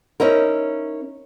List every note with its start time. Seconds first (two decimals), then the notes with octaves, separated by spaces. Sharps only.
0.20 C#4 D#4 E4 A#4